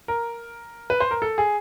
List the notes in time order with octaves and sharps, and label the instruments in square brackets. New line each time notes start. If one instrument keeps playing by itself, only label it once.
[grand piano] A#4
B4
C5
A#4
A4
G#4